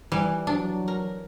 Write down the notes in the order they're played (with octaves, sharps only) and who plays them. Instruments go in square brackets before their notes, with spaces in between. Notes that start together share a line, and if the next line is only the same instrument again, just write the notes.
[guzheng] E3 [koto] G3
[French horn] F#3 [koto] D4
[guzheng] A#4